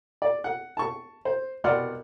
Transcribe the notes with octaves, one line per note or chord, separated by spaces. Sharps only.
D5
F#5
A5 C#6
C5
C2 B2 D5 F#5 C6 F6